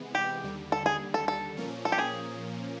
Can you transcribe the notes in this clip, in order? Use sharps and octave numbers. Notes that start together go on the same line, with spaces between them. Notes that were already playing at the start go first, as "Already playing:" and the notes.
Already playing: C3 E3 G#3 B3
G4
D#2 D3 G3
A4
G#4
A4
A4
A#2 F3 A#3 C#4
A4
G4
G#4